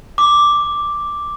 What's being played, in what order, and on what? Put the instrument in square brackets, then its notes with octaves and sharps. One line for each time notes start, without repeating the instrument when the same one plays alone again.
[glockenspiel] D6